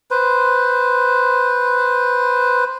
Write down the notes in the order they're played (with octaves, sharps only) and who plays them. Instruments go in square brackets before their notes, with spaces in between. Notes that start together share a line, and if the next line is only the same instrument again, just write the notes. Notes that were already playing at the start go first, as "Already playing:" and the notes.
[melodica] B4 C5